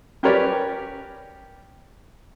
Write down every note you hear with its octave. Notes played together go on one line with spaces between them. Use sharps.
C#4 G4 A#4 B4 C#5 D5